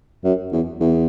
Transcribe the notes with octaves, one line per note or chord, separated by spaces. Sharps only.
F#2
E2
E2